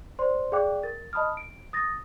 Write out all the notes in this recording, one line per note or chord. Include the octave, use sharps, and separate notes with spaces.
C5 D5 C6
G#4 D5 F5 G5 D6 F#6
A#4 A6
D#5 A5 B5 D#6 F6
D7
D#6 A6 A#6